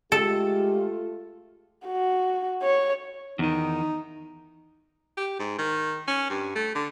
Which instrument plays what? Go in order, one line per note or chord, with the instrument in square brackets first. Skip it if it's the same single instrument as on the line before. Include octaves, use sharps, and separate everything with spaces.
[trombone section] G#3 G4 [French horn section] A3 F4 [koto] A4
[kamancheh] F#4
C#5
[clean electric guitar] E2 D#3 [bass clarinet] D#4
[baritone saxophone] G4
G#2
D#3
C#4
G2
A3
D3